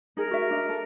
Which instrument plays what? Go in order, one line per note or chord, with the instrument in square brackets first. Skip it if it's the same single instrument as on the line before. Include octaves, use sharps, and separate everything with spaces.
[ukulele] D#4 G#4 [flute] A#4
[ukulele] F#4 E5
D4 D#5
A4